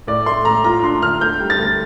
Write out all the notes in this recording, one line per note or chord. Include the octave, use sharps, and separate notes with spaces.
A2 D5
A3 C6
A2 A#5
F4 A#5
D4 C6
D3 F6
D2 G6
G3
A6
D2